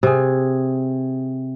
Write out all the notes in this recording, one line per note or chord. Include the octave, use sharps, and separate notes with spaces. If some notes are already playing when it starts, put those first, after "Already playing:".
C3 G#4